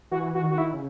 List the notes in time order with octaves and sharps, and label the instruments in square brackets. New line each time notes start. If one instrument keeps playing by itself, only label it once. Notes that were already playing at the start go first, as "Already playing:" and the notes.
[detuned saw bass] E3 [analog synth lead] F#4
[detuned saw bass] E3 [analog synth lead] F#4
[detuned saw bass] D#3
[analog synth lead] F#4
E4
[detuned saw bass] C#3